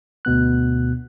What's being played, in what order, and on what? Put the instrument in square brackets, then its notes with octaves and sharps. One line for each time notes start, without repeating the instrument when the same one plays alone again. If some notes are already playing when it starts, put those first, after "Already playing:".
[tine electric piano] D2 B2 B3 F#6